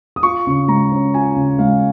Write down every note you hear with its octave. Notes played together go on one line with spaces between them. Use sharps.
D#6
F4 C#6
C#3
G#3 A#5
C#4
F4 G#5
C#3
G#3 F5